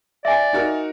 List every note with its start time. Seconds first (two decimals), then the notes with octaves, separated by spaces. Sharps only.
0.25 D5 E5 G#5
0.53 D#4 F#4 A#4